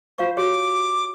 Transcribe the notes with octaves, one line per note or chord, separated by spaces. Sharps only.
F4 C5 F5 C#6
F#4 G4 C#5 D6